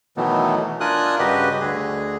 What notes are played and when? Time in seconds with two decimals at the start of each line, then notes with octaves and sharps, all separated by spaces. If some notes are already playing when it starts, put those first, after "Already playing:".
0.17 B2 D#3 E3 F#3 A3 B3
0.80 D4 F4 A#4 G#5 D#6 F#6
1.19 G2 C#3 F#4 G4 B4 D#5
1.60 D2 D3 G#4